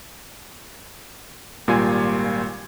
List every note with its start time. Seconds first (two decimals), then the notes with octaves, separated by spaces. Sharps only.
1.67 G#1 A#2 G3 F4 G#5 G#6